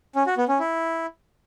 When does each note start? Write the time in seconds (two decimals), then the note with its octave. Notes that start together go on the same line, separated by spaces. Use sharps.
0.16 C#4
0.27 F#4
0.38 B3
0.49 C#4
0.60 E4